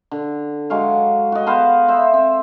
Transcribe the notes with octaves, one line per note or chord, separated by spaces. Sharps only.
D3
F#3 G#3 C#5 F5
F#4 D#5
B3 C5 F5 A5
C5 E5
C4